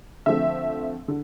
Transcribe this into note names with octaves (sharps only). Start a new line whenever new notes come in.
D3 F3 A3 C4 E5
D3